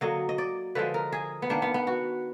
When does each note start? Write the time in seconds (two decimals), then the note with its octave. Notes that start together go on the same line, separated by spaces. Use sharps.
0.01 D3 F#3 A#3 D#5
0.29 D#5
0.38 D5
0.75 D3 F3 G#3 B4
0.94 A#4
1.12 G#4
1.42 B3
1.50 D#3 A#3 D4
1.62 B3
1.74 B3
1.87 F#4